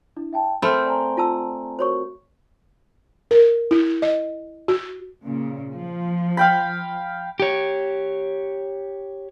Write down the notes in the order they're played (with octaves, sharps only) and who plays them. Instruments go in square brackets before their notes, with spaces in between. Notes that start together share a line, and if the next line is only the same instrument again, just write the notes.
[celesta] D4 E4
E5 G5 A5
[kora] A3 C4 [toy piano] A#4 B5 [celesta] F6 G6
[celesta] D5 G#5 A#5
[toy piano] F4 A5 E6
[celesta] F#4 A#4 [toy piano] C5 C#5 C#6
[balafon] A#4
E4
D#5
F#4
[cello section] A#2 C#3
F3
[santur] F5 G5 B5
[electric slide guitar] G4 C#5